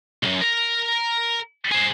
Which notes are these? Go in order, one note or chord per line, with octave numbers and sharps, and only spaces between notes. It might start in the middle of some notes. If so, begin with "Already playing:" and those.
B1 F#2
A#4 A#5
G#4 C5